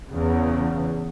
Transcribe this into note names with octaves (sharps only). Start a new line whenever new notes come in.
E2 C#3